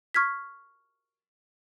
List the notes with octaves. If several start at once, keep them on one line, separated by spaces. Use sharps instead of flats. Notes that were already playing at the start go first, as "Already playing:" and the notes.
C#6 F6 G#6 B6